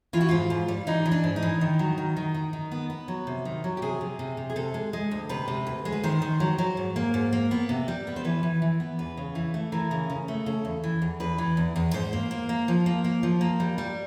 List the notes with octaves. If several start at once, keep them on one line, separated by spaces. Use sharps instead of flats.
E3 F4
F#4
G#2 F4
G#2
G3
E3 D#4
E3
D4
G#2
D#4
E3
D#3
F#3
D#3
D#3
D#3
D#3
B3
B3
F#3
C3
D#3
F#3
G4
C3 G#4
C3
C3
C3
G#4
C3 A4
G#3
G#3
D2
C3 B4
C3
D2
G#3
B4
D#3 C5
D#3
F#3
F#3
G#2
A#3
G#2
A#3
B3
C3
G3
B3
C5
E3 B4
E3
E3
B3
E2 B4
C#3
E3
A3
E3 A#4
C#3
C#3
A3
C#3 A4
E2
E3
E2
E2 B4
E3
E2
E2
G#2 C5
A#3
A#3
A#3
F3
A#3
A#3
F3
A#3
G3
G3